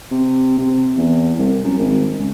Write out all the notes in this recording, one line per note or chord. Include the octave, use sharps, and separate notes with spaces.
C3
C3
E2
C2
F#2
G#1
C#2